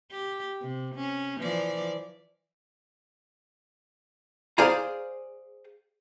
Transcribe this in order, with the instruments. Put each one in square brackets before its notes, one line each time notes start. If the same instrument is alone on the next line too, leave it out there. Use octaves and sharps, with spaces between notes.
[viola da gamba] G4
C3
C#4
E3 F3 D5
[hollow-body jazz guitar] G#4 C5 D5 F5 G#5 A#5